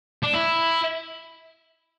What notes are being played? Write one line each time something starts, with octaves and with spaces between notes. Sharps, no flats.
D4
E4